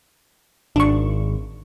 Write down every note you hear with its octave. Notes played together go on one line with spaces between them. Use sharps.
G#1 D4 C#6